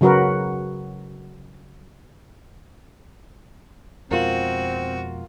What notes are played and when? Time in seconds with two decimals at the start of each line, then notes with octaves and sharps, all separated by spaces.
0.01 C#3 F#3 F#4 A#4 B4
4.11 F2 B2 G#3 C4 F4 F#4 A#4